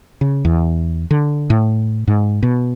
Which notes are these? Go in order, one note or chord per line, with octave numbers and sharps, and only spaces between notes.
C#3
E2
D3
A2
G#2
B2